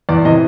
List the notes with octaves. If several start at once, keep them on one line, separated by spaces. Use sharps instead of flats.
E2 D5
C3 E3 D#5